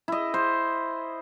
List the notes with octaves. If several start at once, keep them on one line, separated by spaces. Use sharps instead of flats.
E4 D#5
C5